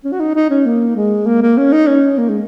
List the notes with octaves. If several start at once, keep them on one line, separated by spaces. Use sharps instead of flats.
C#4
F#4
D#4
D#4
C#4
A#3
G#3
A#3
A#3
C#4
D#4
C#4
A#3
G#3